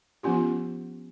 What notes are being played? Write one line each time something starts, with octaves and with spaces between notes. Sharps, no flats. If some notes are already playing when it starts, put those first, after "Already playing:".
F3 B3 C#4 F4 G4